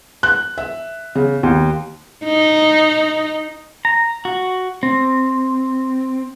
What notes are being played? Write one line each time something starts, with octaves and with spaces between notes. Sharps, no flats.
F#6
E5
C#3
D#2
D#4
A#5
F#4
C4